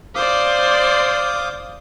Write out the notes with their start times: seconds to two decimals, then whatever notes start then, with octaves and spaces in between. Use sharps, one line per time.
0.15 C5 D5 F5 D6 D#6